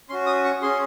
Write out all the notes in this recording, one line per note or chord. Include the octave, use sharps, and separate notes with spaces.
C#4 F#4 C6
D#6
C#6
C#4 G#4 C6